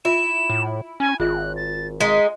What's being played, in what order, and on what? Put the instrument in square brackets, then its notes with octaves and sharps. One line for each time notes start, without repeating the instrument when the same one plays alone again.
[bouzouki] E4 [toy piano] F4 E5 B5 [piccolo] E7
[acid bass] A2
[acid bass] C#4 [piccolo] G#5
[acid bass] G#1 [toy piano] F4 G#4 E5 [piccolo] F#6
[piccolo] A6
[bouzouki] G#3 D#4 [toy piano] E5 F5 [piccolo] B6